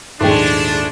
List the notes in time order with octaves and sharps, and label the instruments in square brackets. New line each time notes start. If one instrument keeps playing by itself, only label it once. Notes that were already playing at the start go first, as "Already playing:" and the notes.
[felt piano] A#1 D#2 G#2 [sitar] G#3 A3 [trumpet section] D4 [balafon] D#4 G5